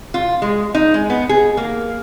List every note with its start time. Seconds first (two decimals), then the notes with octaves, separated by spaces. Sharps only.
0.14 F4
0.42 G#3
0.75 D#4
0.94 G#3
1.10 B3
1.29 G#4
1.57 A#3